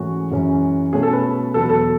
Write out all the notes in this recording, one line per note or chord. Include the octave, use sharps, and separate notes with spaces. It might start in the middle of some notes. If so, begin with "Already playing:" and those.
Already playing: G#2 E3 A3 C#4 F#4
F#2 E3 G#3 C#4
B2 A3 C#4 G#4
A4
B4
E2 B2 F#3 A4
B4
A4